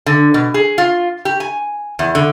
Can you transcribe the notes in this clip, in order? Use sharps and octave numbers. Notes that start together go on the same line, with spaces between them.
D3
B2
G#4
F4
G4
G#5
E2
D3